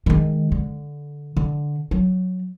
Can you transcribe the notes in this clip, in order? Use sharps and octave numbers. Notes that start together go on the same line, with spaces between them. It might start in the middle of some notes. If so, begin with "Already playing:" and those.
D#3 G#3
D3
D3
F#3